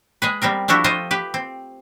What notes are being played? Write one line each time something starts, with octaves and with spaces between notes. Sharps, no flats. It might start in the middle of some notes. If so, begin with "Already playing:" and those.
G#3 G#4 B4
G3 B3 C4 A#4
F3 A3 D4 E4 F#4 G4
A3 F4 C5 D#5 G5
G4 B4
C4